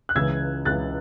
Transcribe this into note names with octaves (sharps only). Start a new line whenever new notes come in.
F#6
C#2 C#3 E3 E6 G#6
C#2 C#3 E3 F#6 A6